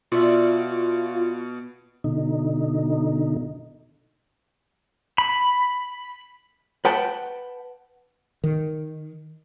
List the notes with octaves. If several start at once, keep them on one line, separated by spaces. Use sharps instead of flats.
B2 F4 F#4 D5 E5
B2 D3 D#4
B5
B4 F#5 G5 A5
D#3